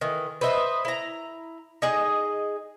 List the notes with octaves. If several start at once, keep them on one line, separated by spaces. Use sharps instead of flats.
D#3 E3
B4 C5 D#5 E5
E4 A#5
D#4 G#4 D#5